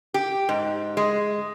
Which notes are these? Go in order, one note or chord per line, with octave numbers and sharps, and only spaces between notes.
G4
G#2
G#3